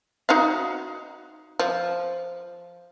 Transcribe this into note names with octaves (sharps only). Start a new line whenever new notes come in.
D#4 F#4 F5
F3